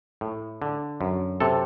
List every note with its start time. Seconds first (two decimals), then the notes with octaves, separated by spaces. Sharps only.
0.21 A2
0.62 D3
1.01 F#2
1.40 C3 A4